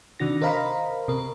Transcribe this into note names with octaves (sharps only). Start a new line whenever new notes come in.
C3 D#3 D4 F#4 A#6
A#4 C5 D#5 F5 A#5 B5
C3 A#4